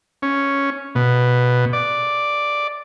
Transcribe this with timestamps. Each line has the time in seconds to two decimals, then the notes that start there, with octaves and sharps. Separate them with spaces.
0.22 C#4
0.95 B2
1.73 D5